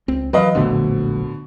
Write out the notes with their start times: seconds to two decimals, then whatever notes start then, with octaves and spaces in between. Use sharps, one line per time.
0.08 C#2 C4
0.33 E3 F#3 B4 D#5 F5
0.55 D1 A#1 B2 D3 A3